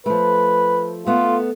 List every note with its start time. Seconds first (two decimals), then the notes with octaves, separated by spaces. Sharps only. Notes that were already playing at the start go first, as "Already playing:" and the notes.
0.06 F3 A3 B4
1.06 A3 B3 F4